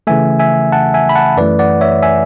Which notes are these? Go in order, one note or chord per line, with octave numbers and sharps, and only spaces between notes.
C#3 E3 A3 E5 G#5
E5 G#5
F#5 A5
E5 G#5
B5
F#5 A5
F#2 E3 A3 B4 D5
D5 F#5
C#5 E5
E5 G#5